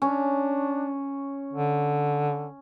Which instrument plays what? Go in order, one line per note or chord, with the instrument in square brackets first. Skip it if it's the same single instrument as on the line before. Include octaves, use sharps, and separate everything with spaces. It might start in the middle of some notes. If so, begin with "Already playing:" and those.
[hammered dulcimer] C#4 [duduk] D4
[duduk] D3